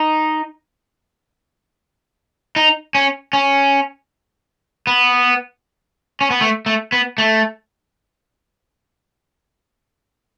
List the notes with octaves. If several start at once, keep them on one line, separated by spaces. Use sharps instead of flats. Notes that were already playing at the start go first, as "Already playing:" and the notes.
Already playing: D#4
D#4
C#4
C#4
B3
C#4
B3
A3
A3
B3
A3